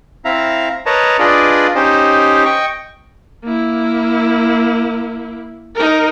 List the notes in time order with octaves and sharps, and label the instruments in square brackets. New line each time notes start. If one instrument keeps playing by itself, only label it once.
[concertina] C4 E4 E5 F5 A#5
A#4 B4 C#5 D#5 A5 A#5
D4 F4 G#4 B4 D5 D#5
C#4 D#4 G4 C5 D#5
D#5 G5 C#6
[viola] A#3 E4
D#4 A#4